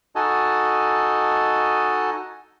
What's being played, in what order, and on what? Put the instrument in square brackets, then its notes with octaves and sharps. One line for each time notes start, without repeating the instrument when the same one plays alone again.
[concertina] D#4 F#4 A4 D#5 G#5 A5